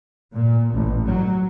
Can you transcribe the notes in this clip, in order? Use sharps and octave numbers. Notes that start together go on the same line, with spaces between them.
A#2
A1
F#3